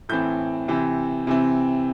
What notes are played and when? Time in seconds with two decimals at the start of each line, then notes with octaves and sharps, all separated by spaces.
0.09 A2 E3 C4 G6
0.68 C3 E3 C4
1.27 C3 E3 C4